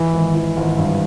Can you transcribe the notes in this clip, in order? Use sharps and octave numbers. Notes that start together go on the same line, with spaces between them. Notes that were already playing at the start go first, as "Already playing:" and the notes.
Already playing: E3
G#1
E3
G#1
G2